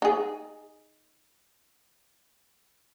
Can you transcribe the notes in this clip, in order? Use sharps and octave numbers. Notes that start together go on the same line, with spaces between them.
D#4 G#4